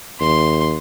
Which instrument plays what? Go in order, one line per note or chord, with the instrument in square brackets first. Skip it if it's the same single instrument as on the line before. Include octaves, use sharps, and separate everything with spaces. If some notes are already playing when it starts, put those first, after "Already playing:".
[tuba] D#2 [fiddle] C6